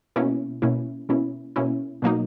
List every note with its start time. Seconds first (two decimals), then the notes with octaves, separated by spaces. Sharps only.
0.16 B2 A#3 C#4 E4
0.62 B2 A#3 C#4 E4
1.09 B2 A#3 C#4 E4
1.56 B2 A#3 C#4 E4
2.02 B2 F#3 A#3 D#4